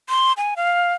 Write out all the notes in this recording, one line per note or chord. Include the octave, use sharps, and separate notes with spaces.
C6
G#5
F5